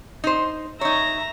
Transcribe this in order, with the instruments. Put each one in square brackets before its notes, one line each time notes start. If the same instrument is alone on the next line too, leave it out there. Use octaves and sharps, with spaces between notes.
[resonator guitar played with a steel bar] D#4 C5
[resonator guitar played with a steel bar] D#4 C#5 [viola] E5 A#5